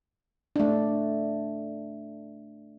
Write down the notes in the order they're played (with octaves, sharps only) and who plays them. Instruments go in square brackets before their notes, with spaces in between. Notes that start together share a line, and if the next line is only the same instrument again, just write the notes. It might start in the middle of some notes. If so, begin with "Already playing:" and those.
[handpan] A3 D4